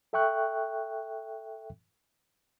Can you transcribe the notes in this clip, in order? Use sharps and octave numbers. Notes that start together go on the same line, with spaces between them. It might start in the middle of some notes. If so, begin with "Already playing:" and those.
A4 E5 G5 C#6 F#6